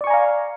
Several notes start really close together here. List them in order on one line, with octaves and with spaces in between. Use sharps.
D5 C#6 G#5 A#5 F5